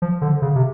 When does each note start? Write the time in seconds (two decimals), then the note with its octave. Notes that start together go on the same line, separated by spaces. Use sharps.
0.02 F3
0.22 D3
0.42 C#3
0.56 C3